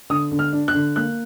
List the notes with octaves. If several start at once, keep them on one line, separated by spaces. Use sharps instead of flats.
D3 D#6
D3
F6
D4
F#6
D3
A#3 F#6